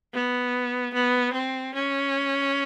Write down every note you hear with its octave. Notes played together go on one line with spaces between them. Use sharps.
B3
B3
C4
C#4